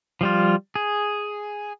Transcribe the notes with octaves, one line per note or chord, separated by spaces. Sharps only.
F3 G3 F4
G#4